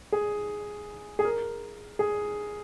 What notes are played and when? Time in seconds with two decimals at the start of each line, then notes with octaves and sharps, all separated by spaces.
0.12 G#4
1.19 G#4
1.24 A#4
1.99 G#4